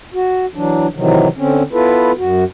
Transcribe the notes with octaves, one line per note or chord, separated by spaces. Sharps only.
F#4
E3 F#3 D4
C3 D#3 E3 F#3
D3 C4 C#4
B3 E4 F4 A4 B4
F#2 F#4